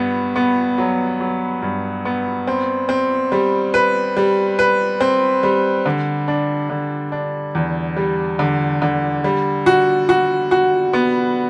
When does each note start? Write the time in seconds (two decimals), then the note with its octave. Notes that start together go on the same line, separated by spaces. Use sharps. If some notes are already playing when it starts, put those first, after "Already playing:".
Already playing: G2 B3
0.36 B3
0.78 F#3
1.20 F#3
1.62 G2
2.05 B3
2.47 C4
2.89 C4
3.32 G3
3.74 B4
4.17 G3
4.59 B4
5.00 C4
5.43 G3
5.86 D3
6.28 D4
6.70 D3
7.12 D4
7.55 E2
7.96 G3
8.39 D3
8.82 D3
9.24 G3
9.66 F#4
10.09 F#4
10.51 F#4
10.93 B3